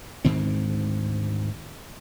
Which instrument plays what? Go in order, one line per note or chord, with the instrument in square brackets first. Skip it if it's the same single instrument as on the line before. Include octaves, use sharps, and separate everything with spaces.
[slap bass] D2 G#2 D#3 C4